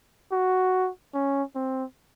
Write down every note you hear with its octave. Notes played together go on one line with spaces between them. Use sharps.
F#4
C#4
C4